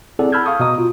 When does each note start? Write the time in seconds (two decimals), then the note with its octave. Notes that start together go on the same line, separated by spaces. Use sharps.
0.19 C4 E4 G#4 A4 D5 F#5
0.32 A5 B5 E6 F6 G6 G#6
0.46 F5 C#6 D#6
0.60 B2 B3 F#4 D#5 A#5 D#6
0.78 F4